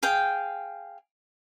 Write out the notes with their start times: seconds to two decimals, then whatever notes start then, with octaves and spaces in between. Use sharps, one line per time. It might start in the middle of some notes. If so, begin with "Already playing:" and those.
0.03 G#4 F5 G5